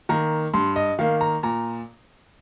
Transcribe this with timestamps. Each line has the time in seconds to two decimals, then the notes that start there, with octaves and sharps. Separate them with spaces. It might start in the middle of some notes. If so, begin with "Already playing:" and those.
0.09 D#3 A#3 A#5
0.54 G2 C6
0.76 D#5
0.99 D#3 A#3 F5
1.21 A#5
1.43 A#2 A#5